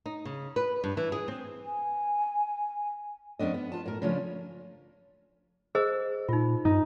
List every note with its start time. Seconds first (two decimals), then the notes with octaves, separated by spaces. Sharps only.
0.06 D#4
0.25 C#3
0.56 B4
0.84 G2
0.97 E3
1.12 G#4
1.28 C4
1.65 G#5
3.39 F2 B3 C#4 D4 D#5
3.54 B3
3.72 F4 A5
3.85 A2 A#4
4.02 C#3 F3 A3 C#4 D4 F4
5.75 G#4 C5 D#5 E6
6.29 A#2 D#4 F4
6.65 G2 D#4